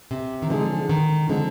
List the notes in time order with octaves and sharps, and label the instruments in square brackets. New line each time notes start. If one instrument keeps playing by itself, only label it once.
[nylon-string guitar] C3
D#3
[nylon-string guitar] D3 [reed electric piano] F3 G#3 C4 D#4 G#4
[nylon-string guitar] D#3
[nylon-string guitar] D3 [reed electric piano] F3 G#3 C4 D#4 G#4